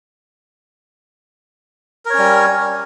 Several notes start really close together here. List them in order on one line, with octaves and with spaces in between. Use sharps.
A#4 C#5 C#4 G3